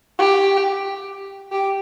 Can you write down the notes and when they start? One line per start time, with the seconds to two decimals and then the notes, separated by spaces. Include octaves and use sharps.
0.18 G4
1.52 G4